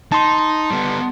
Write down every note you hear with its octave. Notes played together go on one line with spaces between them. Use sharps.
D#4 A5 C6
G3 B3